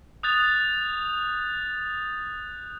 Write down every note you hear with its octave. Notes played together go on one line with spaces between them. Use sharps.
D#6 F#6 G6 A6 F7